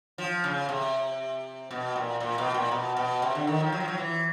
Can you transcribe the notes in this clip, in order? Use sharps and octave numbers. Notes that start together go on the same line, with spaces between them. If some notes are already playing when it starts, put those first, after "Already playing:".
F3
C#3
C3
B2
A#2
A#2
B2
A#2
B2
B2
C3
D3
D#3
F3
F#3
F3
F#3
E3